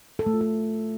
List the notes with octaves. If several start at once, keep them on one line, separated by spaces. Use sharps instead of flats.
A4
A3
F4
A4